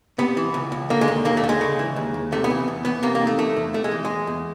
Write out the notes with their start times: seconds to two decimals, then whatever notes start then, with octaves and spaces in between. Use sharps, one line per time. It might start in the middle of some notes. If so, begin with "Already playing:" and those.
0.18 C3 B3
0.37 E3
0.54 C#2
0.72 C#2
0.90 D3 A#3
1.01 G#3
1.08 D#2
1.25 D#2 A#3
1.37 A3
1.44 D3
1.49 G#3
1.61 C#3
1.79 E3
1.96 D#2
2.14 D#2
2.32 C3 A3
2.44 B3
2.50 E3
2.68 E2
2.85 E2 B3
3.02 C3 A#3
3.15 A#3
3.21 D#3
3.27 A3
3.39 E2 A3
3.56 E2
3.74 C3 A3
3.84 G#3
3.91 E3
4.05 E2 G#3
4.27 E2